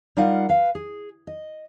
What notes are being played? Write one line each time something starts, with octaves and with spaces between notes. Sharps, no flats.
G3 D#4 F4 A#4 F5 F#5
B4 F5
G#4
D#5